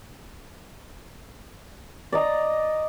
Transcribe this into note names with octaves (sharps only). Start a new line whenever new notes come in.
D5 D#5 A#5